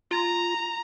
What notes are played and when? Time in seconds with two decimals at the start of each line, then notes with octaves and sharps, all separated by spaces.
0.11 F4 A#5